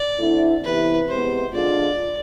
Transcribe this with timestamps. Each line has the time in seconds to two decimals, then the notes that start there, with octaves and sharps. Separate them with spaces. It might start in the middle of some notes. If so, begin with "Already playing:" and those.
Already playing: D5
0.18 D3 A3 C4 E4
0.64 C3 E3 B3 E4 B4
1.09 C3 G#3 B3 C5
1.53 D3 G#3 D4 F4 D5